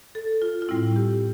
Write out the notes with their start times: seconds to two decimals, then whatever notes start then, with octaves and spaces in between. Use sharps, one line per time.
0.15 A4
0.42 F4
0.62 F4
0.69 A2 G3 C4 E4
0.96 G4